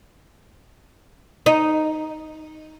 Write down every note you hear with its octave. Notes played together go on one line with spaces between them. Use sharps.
D#4